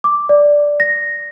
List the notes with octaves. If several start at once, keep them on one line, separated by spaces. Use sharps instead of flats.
D6
D5
A#6